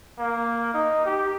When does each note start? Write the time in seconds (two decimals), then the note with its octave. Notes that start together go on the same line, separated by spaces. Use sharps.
0.19 A#3
0.74 D#4
1.06 G4